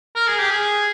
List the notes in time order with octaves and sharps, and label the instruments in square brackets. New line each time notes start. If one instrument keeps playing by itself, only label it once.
[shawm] A#4
G#4
G4
G#4